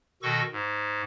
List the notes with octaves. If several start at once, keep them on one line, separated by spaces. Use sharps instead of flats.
B2 D#3 F#4 A4 C#6 A#6
G#2